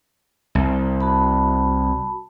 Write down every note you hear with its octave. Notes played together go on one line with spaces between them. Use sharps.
C2
F#4 A5 B5